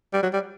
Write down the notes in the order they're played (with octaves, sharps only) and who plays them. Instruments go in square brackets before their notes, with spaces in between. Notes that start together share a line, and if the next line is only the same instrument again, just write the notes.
[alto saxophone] G3
F#3
G3